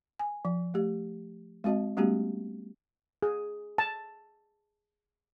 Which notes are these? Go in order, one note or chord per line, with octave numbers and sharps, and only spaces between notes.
G#5
F3
A3 G4
G#3 C4 F#4 D#5 A5
G3 A3 B3 C#4 F#4 G4
G#4
A5